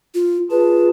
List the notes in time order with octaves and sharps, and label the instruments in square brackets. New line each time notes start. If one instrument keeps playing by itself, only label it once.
[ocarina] F4
[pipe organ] F4 G#4 A5 [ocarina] B4